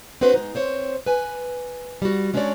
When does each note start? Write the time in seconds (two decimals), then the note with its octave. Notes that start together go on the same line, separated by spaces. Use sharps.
0.21 C4 D4 F#4 B4 C5
0.34 G#3 D#4
0.55 C4 C5 C#5
1.06 B4 G#5
2.02 G3 F#4
2.34 G#3 C#4 D4 F#4 C#5 D5